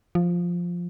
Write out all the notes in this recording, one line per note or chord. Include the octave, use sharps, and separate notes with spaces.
F3